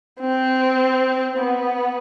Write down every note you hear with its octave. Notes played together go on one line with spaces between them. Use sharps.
C4
B3